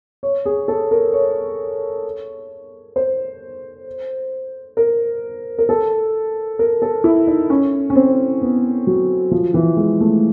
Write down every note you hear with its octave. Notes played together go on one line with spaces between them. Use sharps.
C#5
G#4
A4
A#4
C#5
C5
A#4
A#4
A4
A#4
A4
E4
D#4
C#4
C#4
C4
B3
F#3
F3
E3
G#3
A3